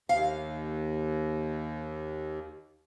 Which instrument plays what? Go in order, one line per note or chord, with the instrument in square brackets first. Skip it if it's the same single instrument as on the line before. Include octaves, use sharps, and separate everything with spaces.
[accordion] D#2 [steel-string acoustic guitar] F5